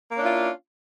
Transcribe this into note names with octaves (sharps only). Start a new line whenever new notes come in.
A#3 C#4 D4 E4 F4